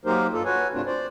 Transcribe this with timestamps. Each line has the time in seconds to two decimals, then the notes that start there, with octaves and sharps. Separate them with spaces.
0.05 F#3 A#3 D#4 G4 A#4 C5
0.33 G2 F4 A4
0.45 F#4 B4 C#5 G#5
0.74 G2 C3 A3 C4 D4 F4
0.86 C5 D5